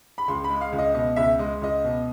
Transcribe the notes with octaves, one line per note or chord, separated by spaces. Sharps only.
B5
C#2 C6
G#3 B5
F5
C#2
D#5
B2 D#5
C#2 E5
G#3 D#5
C#2 D#5
B2